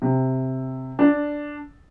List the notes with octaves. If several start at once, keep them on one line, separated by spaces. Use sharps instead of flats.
C3
D4